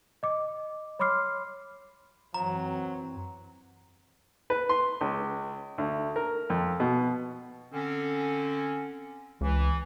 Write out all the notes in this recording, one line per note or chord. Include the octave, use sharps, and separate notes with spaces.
D#5 D6
C#5 B5 C6 D6 F6 C7
F#2 E3 F#3 C4 A#5
B4
C6
C#2
D2
A#4
F2
B2
D3 C4 C#4
C#2 E3